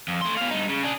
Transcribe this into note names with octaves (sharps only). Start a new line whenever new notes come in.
F2
A3 C6
B2 F5
G2 D#4
C#3
D4 G#4